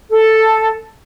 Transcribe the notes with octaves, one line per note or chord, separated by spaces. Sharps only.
A4